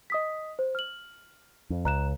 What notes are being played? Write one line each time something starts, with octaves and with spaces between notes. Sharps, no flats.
D#5 D#6 B6
C5
F6 F#7
F2
C#2 A#5 F#6 E7